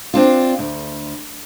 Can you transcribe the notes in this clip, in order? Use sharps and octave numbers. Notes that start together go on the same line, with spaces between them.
C4 D4 F4
D2